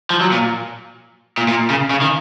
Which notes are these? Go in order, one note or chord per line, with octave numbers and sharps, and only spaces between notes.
F3
F#3
A#2
A#2
A#2
C#3
C#3
D#3